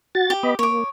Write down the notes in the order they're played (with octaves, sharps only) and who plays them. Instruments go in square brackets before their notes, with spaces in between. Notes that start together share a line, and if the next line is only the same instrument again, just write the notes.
[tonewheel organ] F#4 A6
[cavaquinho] G4
[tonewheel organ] B3 D#5 B5
[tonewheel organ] A#3 [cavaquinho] C#5 D6